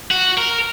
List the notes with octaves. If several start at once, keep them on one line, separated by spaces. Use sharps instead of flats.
F#4
A#4